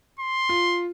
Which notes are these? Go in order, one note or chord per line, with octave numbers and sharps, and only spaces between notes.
C6
F4